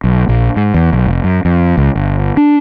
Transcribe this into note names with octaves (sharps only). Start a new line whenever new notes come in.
B1
A#1
G#2
E2
B1
F1
F#2
F2
C#2
G1
D4